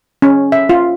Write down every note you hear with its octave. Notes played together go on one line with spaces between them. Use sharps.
C#4
E5
F4